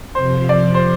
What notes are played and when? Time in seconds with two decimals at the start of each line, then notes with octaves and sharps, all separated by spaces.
0.15 F2 C3 F3 C5
0.49 D5
0.74 C5